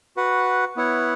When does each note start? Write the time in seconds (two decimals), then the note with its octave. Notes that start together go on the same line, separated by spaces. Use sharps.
0.17 F#4 B4 F#5
0.76 B3 E4 C#5 F#5